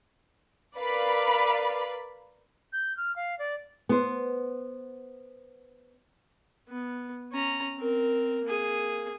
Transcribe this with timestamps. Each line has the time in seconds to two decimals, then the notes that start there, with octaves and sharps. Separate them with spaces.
0.77 A#4 B4 D5 F5 B5
2.73 G6
2.97 F6
3.16 F5
3.39 D5
3.89 B3 C5
6.68 B3
7.32 C#4 A#5
7.77 C4 A#4
8.44 A#3 G#4